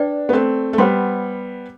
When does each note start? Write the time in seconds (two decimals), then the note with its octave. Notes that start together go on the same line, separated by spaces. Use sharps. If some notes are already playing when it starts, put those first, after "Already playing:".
Already playing: D4 B4 D5 G5
0.29 B3
0.33 A3 C4
0.73 A3
0.78 G3 B3 C5 F#5 C6